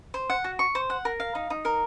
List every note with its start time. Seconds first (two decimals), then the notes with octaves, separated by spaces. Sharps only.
0.14 C5
0.30 F#5
0.44 F#4
0.59 C#6
0.75 C5
0.90 F#5
1.05 A#4
1.20 F5
1.35 D#4
1.50 D#4
1.65 A#4